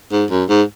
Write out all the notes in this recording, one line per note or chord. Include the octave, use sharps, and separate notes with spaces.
G#2
F#2
G#2